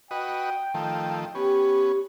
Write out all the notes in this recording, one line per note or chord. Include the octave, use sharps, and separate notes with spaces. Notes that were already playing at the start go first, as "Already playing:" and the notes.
F#4 B4 D#5 G5
D#3 F3 A3
B3 C#4 G4